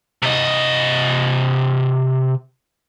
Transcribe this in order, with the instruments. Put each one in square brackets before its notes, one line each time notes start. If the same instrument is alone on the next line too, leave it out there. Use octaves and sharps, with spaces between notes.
[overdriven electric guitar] C3 D#5